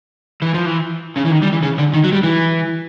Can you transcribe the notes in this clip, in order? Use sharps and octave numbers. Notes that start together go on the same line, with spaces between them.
E3
F3
E3
C#3
E3
D#3
G3
E3
C#3
D3
D#3
F#3
G3
E3